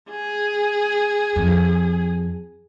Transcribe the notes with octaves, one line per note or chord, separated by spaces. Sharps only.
G#4
F2